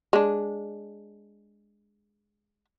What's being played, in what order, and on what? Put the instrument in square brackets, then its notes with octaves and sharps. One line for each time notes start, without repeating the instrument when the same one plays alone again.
[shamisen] G#3 D4